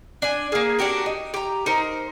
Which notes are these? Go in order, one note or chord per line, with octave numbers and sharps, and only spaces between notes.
D4 G#5
A#3 G#4
D4 F#4 G4 A#4
D#4
G4 A#5
D#4 A#4 C5